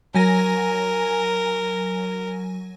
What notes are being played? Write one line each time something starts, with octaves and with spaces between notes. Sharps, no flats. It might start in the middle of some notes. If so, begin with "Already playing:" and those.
F#3 A#4 G#5 A#6